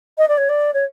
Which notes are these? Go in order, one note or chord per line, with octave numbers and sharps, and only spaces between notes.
D#5
D5
C#5
D5
C#5